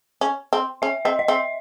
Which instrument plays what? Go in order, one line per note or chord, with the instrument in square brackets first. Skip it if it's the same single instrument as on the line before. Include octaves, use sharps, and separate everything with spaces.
[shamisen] C#4
C4
[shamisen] C#4 [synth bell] E5
[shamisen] C4 [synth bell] D#5
[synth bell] D#5
[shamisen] C4 [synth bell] E5